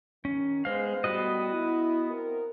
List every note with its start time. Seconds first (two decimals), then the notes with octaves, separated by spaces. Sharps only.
0.25 D#3 C#4
0.65 G#3 B3 G#4 C5 F5
1.04 A2 G3 B3 F#4 D#5
1.53 E4
2.10 C4 E4 A#4